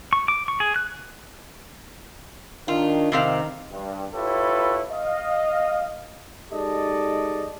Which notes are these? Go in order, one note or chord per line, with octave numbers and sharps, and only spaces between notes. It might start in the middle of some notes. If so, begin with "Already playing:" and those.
C#6
D6
C#6
G#4
F#6
D#3 D4 F4
C3 D#3 C4 F5
G2
E4 F4 G4 A4 B4 C#5
D#5 F5
G#3 D#4 G4 A4 D5 D#5